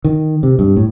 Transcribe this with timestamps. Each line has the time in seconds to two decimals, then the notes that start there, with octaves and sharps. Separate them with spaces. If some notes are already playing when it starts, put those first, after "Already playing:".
0.04 D#3
0.43 C3
0.59 G2
0.77 A2